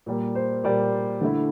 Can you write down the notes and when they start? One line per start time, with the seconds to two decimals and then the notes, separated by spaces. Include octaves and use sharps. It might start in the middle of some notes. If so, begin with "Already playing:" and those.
0.06 A#2 G3 A#3
0.35 C5
0.64 A#2 G3 A#3 D5
1.21 D3 A3 E4